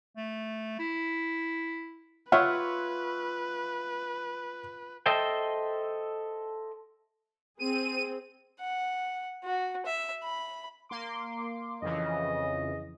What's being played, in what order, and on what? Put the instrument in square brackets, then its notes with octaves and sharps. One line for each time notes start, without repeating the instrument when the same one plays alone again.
[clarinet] A3
E4
[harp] F4 [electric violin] B4 [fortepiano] C#5 E5 F#5
[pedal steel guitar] A4 C5 D#5 E5 G5
[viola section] C4 G#4 [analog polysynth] D#7
[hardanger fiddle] F#5
F#4
E5
B5
[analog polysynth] A#3 C6 D6
[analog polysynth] F2 C#3 E3 [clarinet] D#5